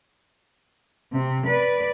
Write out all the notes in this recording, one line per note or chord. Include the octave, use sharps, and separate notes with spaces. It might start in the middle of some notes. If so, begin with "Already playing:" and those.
C3
B4 D5